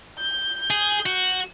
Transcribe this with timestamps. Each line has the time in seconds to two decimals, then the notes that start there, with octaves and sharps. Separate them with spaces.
0.18 G6
0.70 G#4
1.06 F#4 G6